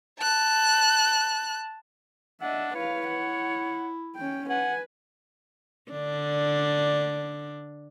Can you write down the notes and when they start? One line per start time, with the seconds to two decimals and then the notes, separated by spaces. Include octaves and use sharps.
0.19 A5 F#6
2.41 D4 D#5 E5 F#5
2.75 E4 B4 C#5 F5
3.08 F#5
4.16 C#4 G5
4.50 B4 F#5 G#5
5.91 D3 D4